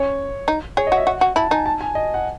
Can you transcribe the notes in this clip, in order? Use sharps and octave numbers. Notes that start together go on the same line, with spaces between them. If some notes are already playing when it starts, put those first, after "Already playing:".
Already playing: C#4 C#5
D#4
G#4 C#5
D#5
F#4
E5
F#4 F#5
F#4
E4 A5
D#4 G#5
A5
G#5
D#5
F#5